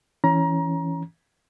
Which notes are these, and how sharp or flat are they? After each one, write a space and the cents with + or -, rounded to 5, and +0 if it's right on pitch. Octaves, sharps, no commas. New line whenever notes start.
E3 +0 C#4 +0 A#5 +25